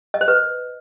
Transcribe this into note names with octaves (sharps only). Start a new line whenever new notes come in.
D#5
C5
B4